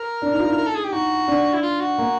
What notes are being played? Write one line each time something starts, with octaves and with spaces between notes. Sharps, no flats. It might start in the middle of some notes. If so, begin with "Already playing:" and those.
Already playing: A#4
D4
D#4
F4
E4
A#4
A4
G#4
G4
D#4 F#4
D4
E4
F4
F#4
A#3